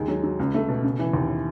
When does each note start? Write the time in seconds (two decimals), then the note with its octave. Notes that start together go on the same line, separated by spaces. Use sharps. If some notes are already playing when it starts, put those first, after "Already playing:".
Already playing: D#2 G#3
0.08 F#3
0.23 F#3
0.39 C#2
0.54 A3
0.68 B2
0.83 C#3
0.99 E3
1.13 D#2